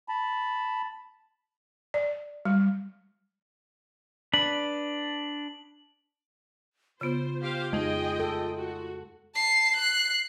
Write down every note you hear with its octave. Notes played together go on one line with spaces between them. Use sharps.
A5 B5
D5
G3
D4 B4 F#7
C#3 B3 F4 C5
G4 C5 F5
F2 G#3 D#4 G#4 D#5 G5
A4
F#4
A5 C7
F#6 C7